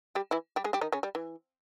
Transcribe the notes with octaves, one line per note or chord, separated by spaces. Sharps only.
G3 G4
E3 E4
G3 G4
G#3 G#4
G3 G4
D#3 D#4
C#3 C#4
G3
E3